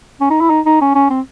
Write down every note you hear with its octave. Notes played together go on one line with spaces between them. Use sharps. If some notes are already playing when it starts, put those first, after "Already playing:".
C#4
D#4
E4
D#4
D#4
C#4
C#4
C4